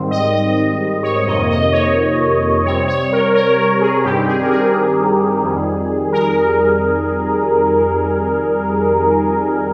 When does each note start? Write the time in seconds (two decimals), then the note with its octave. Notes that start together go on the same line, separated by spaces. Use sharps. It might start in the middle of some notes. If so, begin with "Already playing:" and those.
Already playing: G#2 D#3 G3 C4
0.11 D#5
0.34 D#5
1.03 C#5
1.27 F2 C3 D#3 A#3 D#5
1.50 D#5
1.72 C#5
2.65 C3 G3 C4 C#5
2.88 C#5
3.13 A#4
3.35 A#4
3.59 A#4
3.81 G#4
4.04 G2 D#3 G3 C4 G4
4.27 G#4
4.41 A#4
4.51 G#4
5.43 F2 D#3 G3
6.12 A#4